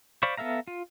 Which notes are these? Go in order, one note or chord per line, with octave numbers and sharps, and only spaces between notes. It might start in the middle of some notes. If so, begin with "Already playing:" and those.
C5 D5 F5 B5 C#6
B3 A4 E5 F5 A#5
F4